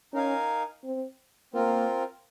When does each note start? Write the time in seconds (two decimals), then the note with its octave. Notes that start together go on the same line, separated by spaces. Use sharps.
0.13 C#4 D#4 A#4 F5 G#5
0.84 C4
1.54 A#3 C4 F4 A#4